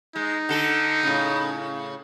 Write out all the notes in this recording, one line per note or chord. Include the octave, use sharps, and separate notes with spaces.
G#3 D#4
D3 A4
A2 C#3